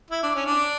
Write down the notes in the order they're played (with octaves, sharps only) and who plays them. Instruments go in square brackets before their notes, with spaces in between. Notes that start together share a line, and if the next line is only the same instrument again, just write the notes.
[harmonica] E4
D4
C#4
D4